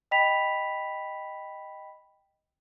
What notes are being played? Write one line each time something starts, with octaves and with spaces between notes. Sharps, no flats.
D#5 G5 B5 B6 F7